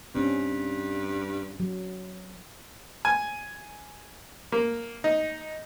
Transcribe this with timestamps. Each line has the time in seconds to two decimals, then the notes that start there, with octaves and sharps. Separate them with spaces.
0.15 G2 C4 C#4
1.60 F#3
3.05 G#5
4.52 A#3
5.04 D#4